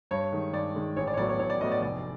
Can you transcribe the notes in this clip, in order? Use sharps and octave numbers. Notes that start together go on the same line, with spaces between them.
G2 C#5
D#3 G#3
G2 D5
D#3 G#3
A1 C#5
D5
C#5
A2 F#3 B3 D5
C#5
A1 C#5
D5
A2 F#3 B3 D#5
D5
F1 D5